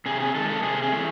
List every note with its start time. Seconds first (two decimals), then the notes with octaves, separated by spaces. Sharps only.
0.06 C3 G#4
0.20 G#4
0.35 D#3 G#3 A4
0.49 A4
0.63 C3 G#4
0.82 G#4
0.92 E3 A3